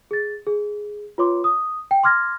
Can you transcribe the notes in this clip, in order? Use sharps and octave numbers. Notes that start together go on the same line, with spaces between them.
G#4 A6
G#4
F4 B4 C#5 C6 D6
D#6
G5
C6 D6 F6 G#6 A#6